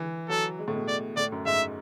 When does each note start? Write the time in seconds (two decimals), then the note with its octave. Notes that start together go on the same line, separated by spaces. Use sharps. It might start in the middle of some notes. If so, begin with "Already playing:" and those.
Already playing: E3
0.29 F#3 A4
0.59 G#3
0.68 A2
0.74 B2
0.88 D5
1.17 A2 D5
1.32 F#2
1.46 G#2 E5